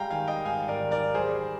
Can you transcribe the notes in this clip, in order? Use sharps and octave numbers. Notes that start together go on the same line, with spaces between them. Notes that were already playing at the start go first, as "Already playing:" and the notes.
Already playing: G3 G#3 F5 G5 G#5 A#5
D#3 F5 G#5
D#5 G5
G#2 F5 G#5
A#4 D5
D#3
A#4 D5
G3 G#4 C5